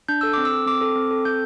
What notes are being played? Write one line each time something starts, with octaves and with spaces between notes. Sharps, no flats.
D4 G6
A4 E6
C4 D6
E6
A4
C4 D6
A4
C4
A4
C4 G6